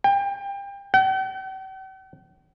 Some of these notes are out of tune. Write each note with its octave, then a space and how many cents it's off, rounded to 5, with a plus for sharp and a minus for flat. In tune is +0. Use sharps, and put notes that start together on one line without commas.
G5 +30
G5 -45